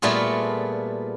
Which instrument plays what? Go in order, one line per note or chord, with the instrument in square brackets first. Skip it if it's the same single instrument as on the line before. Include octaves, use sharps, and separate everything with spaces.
[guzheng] A#2 G3 A3 B3 F4 G#4